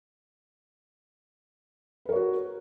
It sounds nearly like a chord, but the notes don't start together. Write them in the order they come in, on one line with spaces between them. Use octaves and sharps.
B4 A#4 C#5 F#4